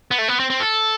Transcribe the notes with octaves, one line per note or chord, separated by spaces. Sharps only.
B3
A3
B3
C4
C4
A4